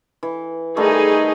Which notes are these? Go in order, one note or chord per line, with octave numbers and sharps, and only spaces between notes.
E3
D#3 G3 A3 D#4 G#4